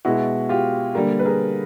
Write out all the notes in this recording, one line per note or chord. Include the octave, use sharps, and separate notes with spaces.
B2 G#3 E4 F#4
F4 G4
D3 G3 A#3
B4
G#4 A#4